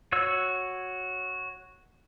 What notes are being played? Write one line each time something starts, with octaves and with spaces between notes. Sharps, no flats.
F#4 C#5 E6